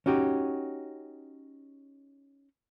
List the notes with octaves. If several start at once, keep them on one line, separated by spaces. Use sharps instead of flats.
C#4 D#4 F#4 G4